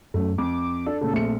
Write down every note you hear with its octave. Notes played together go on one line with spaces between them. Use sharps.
F#2 A3
F2 D6
D4 A4
A#2 C#3 A4
A#1 A3 C4 C#7